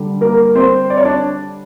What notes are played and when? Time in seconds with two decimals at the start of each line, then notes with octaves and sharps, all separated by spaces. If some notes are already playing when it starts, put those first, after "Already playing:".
Already playing: D3 G3
0.21 A#3 A#4
0.55 C4 C5
0.90 D5
0.97 C#5
1.05 D4 D5